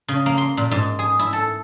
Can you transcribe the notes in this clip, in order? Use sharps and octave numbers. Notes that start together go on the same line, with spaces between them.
C#3
A#3
C6
A#2
G#2
G#4
E4
A4